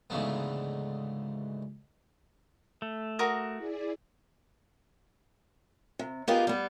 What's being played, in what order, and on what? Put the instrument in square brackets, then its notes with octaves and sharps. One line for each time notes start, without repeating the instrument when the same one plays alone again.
[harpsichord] D2 G#2 C#3 E3 A3 B3
[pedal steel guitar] A3
[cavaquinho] F#4 A#4 D#6
[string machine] E4 G#4 D5
[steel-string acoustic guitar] C3
B3 D#4 F4 G4 G#4 A#4
G3 B3